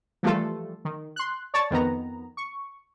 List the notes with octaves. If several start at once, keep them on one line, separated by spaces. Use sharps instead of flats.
E3 F3 G3 A3 F4 A4
D#3
C6 F#6
C#5 D5 A5 A6
F2 D#3 B3 A#5
C#6